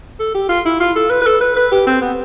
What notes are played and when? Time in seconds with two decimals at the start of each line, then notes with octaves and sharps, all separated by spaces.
0.19 A4
0.35 G4
0.49 F4
0.65 E4
0.80 F4
0.96 A4
1.10 B4
1.22 B4
1.26 A4
1.41 B4
1.56 B4
1.72 G4
1.87 C4
2.02 B3